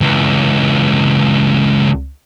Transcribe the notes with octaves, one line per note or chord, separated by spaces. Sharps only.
C#2 E3